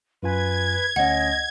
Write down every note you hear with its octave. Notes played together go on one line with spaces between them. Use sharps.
F#2 F4 B4 G#5 G#6
D2 C#4 D#5 F#5